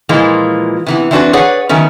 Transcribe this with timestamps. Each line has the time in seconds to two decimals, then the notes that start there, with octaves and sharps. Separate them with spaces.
0.09 A#2 E3 F3 G#3 A#3
0.86 C3 E3 B3
1.11 E3 C4 D4 F#4 B4
1.33 G#4 B4 C#5 D5 F#5
1.69 D#3 F#3 A3 B3 C#4